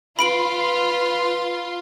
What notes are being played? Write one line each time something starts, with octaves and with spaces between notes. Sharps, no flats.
F4 B4 B5 C6 D7 F#7